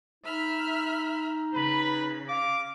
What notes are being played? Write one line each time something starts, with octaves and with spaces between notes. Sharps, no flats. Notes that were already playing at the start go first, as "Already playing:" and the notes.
D#4 E5 B5 F6
C#3 B4 B5
F5 D6